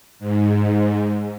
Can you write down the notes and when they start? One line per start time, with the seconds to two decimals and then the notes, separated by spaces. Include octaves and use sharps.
0.19 G#2